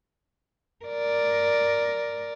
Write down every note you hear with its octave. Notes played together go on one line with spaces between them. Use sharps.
A#4 D5